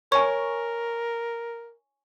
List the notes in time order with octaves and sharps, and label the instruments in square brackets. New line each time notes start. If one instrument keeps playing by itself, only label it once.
[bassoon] A#4 [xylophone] C#5 [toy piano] G#5 C#6